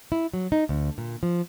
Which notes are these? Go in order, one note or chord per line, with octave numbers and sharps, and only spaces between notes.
E4
F#3
D#4
D2
A#2
F3